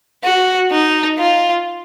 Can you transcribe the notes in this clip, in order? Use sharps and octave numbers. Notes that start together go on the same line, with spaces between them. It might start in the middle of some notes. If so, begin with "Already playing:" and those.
F#4
D#4
F4